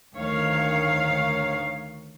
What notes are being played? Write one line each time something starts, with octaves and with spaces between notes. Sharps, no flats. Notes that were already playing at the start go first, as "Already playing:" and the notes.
D2 D#3 C#5 F5